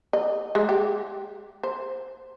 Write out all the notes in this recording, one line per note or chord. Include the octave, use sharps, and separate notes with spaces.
D#5
G#3
G4
C5